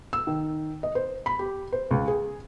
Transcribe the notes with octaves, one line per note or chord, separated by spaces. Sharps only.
E6
D#3
D#5
C5
B5
G4
C5
C#2
G#4